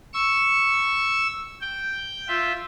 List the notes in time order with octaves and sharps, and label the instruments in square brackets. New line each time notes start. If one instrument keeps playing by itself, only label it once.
[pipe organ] C#6 E6
G5
F4 E5